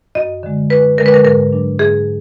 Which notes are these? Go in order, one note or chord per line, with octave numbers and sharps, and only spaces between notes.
F#2 D#5
D3 G#3
F#2 B4
D3 G#3 A#4 B4
A#4
G#2 A#4
F#3 D4
G#2 G#4